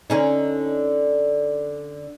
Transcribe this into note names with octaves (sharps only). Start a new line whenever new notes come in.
D3 C#4 D#4